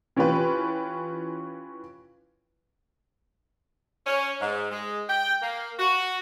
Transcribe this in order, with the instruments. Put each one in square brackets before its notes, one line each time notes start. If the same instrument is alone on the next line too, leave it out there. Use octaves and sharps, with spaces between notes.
[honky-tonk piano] E3 C#4 F4 G4 B4
[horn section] C#4
G#2
G#3
G5
A#3
F#4